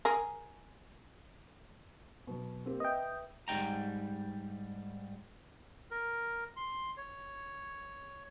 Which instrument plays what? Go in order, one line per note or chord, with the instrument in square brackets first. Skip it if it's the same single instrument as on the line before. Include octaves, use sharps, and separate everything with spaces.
[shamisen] G#4 A#4
[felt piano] B2 F#3
A#3 C4 G4
[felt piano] B4 E5 [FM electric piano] D#5 G5
[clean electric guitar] G#2 G3 G5 A#5
[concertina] A#4
C6
C#5